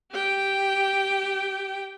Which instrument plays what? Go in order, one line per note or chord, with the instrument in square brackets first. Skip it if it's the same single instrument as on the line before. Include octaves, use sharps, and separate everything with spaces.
[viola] G4 G5